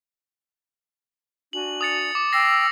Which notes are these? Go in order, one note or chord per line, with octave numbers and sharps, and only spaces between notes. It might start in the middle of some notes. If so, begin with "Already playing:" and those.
D4 F#4 G#5 F#7
D#6 A6 C#7
D6
G5 E6 A#6 C7